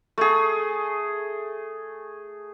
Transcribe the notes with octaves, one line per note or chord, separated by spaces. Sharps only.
A3 G#4